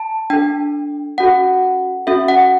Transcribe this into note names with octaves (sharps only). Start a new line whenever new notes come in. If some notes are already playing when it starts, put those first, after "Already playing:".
Already playing: A5
D4 A4 G5
C#4 F#4 A4 F#5
C#4 F#4 A4 E5
F#5